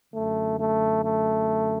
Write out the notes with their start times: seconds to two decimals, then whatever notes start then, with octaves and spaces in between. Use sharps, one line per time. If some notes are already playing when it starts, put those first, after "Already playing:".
0.13 F#2 D3 A3
0.58 A3
1.03 A3